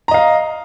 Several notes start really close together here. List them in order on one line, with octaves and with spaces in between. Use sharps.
A#5 D#5 F5